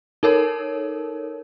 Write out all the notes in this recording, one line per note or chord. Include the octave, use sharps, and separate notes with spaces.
D#4 A4 A#4 C#5